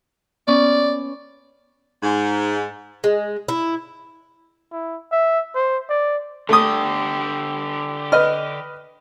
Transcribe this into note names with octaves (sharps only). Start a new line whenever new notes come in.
B3 C#4 D5
G#2
G#3
E4
E4
E5
C5
D5
D3 A3 G4 D#6
B4 D#5 F6